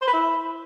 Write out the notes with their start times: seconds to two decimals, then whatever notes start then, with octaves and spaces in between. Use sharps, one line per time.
0.02 C5
0.07 B4
0.13 E4